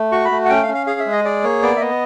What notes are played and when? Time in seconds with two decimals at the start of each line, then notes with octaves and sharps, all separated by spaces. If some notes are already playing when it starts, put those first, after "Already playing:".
Already playing: A3
0.12 F#4 C#6
0.25 B5
0.31 A3
0.45 F#5
0.49 C#4 G5
0.63 F5
0.68 C#4
0.74 F5
0.87 G#4 F5
1.00 E5
1.06 G#3
1.12 D#5
1.25 G#4 D5
1.44 A#3 C#5
1.62 B3 D5
1.76 E5
1.81 B3 D#5